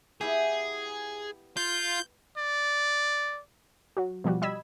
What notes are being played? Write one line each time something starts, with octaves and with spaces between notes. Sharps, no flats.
B3 E4 G4 G#4
F4 G6
D5
F#3 F#4
B2 F3 G3 F#4
G3 D#5 B5 E6 G#6